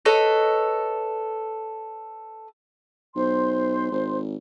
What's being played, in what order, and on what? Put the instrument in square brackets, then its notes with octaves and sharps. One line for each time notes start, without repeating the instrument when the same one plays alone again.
[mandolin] A4 B4 C#5 D#5
[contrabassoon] B1 [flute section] C5 C6
[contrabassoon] G#1